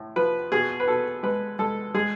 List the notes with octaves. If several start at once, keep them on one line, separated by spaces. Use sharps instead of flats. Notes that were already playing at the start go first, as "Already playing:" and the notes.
Already playing: A2
F3 B4
B2 G#4
B4
B2 A4
G#3 B4
G#3 A4
G#3 G#4